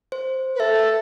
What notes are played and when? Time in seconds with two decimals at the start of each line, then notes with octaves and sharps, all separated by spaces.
0.12 C5
0.55 B4
0.60 A4 E5